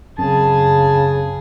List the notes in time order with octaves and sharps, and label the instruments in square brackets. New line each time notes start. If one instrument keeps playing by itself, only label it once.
[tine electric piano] F#2 C4 [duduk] C#3 [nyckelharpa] G#4 [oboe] A5